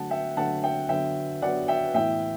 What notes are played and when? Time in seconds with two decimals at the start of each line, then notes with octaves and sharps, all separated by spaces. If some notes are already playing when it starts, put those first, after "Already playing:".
Already playing: D3 F#3 A3 F#5 A5
0.11 E5 G5
0.37 D3 F#3 A3 F#5 A5
0.63 E5 G5
0.89 D3 F#3 B3 E5 G5
1.42 D3 F#3 B3 D5 F#5
1.68 E5 G5
1.94 A2 E3 B3 E5 G5